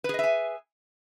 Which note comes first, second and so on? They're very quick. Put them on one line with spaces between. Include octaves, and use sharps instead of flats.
B4 G#4 D#5 E5 G#5